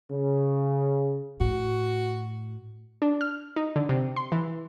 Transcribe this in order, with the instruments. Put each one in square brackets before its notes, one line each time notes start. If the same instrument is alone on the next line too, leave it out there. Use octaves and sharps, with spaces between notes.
[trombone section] C#3
[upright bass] A2 [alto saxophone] F#4
[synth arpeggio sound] D4
F6
D#4
D3
C3
C6
E3